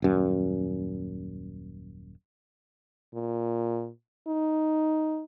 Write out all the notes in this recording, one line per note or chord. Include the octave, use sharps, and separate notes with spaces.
D#1 F#2
A#2
D#4